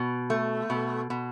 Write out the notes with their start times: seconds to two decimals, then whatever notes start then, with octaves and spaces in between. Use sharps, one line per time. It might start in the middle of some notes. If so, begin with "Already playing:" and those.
Already playing: B2
0.30 A3
0.70 B2
1.10 B2